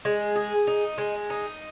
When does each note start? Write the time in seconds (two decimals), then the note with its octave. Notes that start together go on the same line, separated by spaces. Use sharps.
0.05 G#3
0.36 G#4
0.67 D#4
0.98 G#3
1.30 D#4